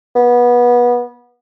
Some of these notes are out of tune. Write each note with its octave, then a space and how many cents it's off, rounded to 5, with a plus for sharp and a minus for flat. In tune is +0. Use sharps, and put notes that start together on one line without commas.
B3 -25